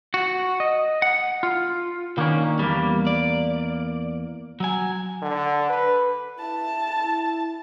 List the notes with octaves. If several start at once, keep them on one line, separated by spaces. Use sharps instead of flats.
F#4
D#5
F#5
F4
D#3 A#3 C#4 D4
E2 G3 A#3
D5
F#3 G#5
D3
B4
E4 A5